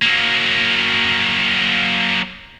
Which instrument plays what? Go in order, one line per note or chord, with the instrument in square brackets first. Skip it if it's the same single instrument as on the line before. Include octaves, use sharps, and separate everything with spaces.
[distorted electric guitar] F#3 A#3